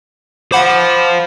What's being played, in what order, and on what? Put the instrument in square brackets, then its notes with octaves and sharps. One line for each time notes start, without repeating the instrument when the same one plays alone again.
[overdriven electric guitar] C5 F5 [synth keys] F#5 B5 D6